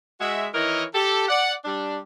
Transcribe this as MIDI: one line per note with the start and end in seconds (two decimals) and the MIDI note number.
0.21 0.47 56
0.21 0.47 66
0.21 0.47 76
0.54 0.84 51
0.54 0.84 52
0.54 0.84 64
0.54 0.84 70
0.54 0.84 73
0.54 0.84 75
0.94 1.29 67
0.94 1.29 69
1.29 1.53 74
1.29 1.53 78
1.65 1.99 55
1.65 1.99 62